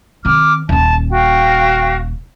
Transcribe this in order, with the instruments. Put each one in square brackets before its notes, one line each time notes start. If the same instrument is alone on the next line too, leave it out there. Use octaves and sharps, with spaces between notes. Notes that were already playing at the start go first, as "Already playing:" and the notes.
[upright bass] D#3 C4 [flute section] D6 F6
[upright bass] D#1 C#4 [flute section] A5
[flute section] F#4 F5 G5